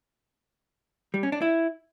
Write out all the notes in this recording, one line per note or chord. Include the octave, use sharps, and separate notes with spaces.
G3
C#4
D4
E4